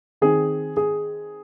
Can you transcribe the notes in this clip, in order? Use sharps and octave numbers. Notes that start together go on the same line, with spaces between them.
D#3 C4 G#4
G#4